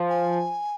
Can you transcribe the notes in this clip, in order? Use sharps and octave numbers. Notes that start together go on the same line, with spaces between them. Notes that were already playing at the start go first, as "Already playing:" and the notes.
Already playing: F3
G#5